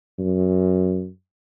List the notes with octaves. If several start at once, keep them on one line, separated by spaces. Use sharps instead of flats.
F#2